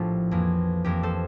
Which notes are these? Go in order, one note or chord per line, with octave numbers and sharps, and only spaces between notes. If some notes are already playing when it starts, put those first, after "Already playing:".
Already playing: A#1 A2 F3 A3 F4 G4 A4
F2 E3 A#3
F2 E3 A#3 G4 A#4
A4 C5